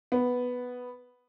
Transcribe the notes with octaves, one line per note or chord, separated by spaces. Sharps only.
B3